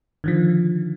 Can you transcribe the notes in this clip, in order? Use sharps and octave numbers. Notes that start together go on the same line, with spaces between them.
D3 D#3 F3